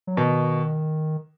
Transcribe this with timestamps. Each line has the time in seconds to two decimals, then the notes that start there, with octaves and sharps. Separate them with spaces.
0.07 F#3
0.17 B2 D#3